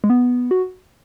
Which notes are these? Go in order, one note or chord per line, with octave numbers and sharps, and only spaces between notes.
G#3
B3
F#4